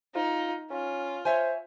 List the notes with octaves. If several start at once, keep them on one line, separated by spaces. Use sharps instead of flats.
D#4 F4
C#4 F4
C5 C#5 E5 G#5